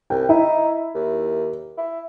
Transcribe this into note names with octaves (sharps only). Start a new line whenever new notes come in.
C2 G5
D#4 E4
D#2
E4